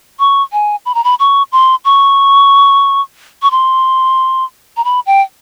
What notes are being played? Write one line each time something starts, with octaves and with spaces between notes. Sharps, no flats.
C#6
G#5
B5
A#5
B5
C#6
C6
C#6
C#6
C6
A#5
B5
G5